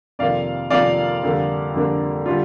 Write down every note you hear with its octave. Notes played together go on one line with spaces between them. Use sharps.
F2 C3 D#3 A#3 F4 D5 F5
F2 C3 D#3 A#3 F4 D5 F5
F2 D3 G3 A#3 D4
F2 D3 G3 A#3 D4
D3 G3 D4 F4